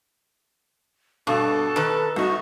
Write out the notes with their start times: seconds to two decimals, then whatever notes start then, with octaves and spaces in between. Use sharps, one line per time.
1.27 G2 B2 A4
1.76 D#3 B4 A5
2.16 C2 D#4 F#4